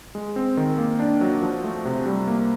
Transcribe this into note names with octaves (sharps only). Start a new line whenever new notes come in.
G#3
C4
D#3
A#3
D4
F#3
F3
A3
C3
G3
A#3